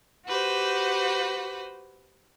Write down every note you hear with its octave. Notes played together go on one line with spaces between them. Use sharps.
F#4 G4 B4 C5